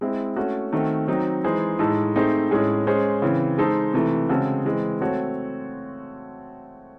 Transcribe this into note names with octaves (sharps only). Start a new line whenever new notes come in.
G#3 C4 E4
A3 C#4 F#4
D#3 A3 C4 F#4
F#3 C4 D#4
E3 G#3 D#4 G#4 C5
A2 G#3 D#4 A4
A3 C4 D#4 G#4 C5
A2 G#3 C#4 G#4
G#3 C#4 G#4 C5
C#3 E3 C4
G#3 D#4 A4 C5
C3 E3 A3
C#3 G#3 C4 F#4 A4
E3 G#3 C4
A3 C4 F#4 A4 C#5